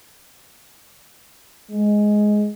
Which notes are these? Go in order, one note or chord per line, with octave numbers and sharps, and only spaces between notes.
G#3